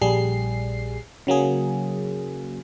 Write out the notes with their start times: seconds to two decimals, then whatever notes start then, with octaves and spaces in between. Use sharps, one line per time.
0.02 A#1 G3 G#4 C7
1.27 C#3 F#3 A#3 G#4